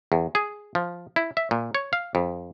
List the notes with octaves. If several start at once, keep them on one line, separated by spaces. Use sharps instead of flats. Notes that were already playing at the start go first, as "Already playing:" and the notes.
E2
G#4
F3
E4
E5
A#2
C#5
F5
F2